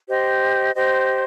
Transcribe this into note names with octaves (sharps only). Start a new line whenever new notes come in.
G4 C5 D#5
G4 C5 D#5